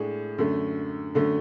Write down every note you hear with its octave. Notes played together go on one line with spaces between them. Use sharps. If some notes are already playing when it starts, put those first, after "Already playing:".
Already playing: A2 G#3 D4 G#4
F#2 D3 A3
F#2 D3 A3